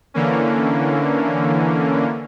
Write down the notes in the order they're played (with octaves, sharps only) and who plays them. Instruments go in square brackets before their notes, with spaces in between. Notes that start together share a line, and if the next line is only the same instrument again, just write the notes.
[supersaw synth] D3 E3 A#3 C#4